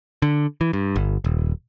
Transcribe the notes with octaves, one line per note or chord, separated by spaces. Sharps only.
D3
E3
G2
G1
D#1